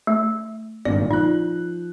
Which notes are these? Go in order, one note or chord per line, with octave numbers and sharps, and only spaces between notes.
A3
G#1 G2 A#2 D5
F3 D#4 F#6